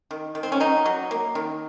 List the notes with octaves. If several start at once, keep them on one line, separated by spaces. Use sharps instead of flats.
D#3
D#3
C4
C#4
F#3 D#4
F#3
A#3
D#3